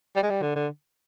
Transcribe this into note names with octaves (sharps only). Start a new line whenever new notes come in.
G3
G#3
G3
D3
D3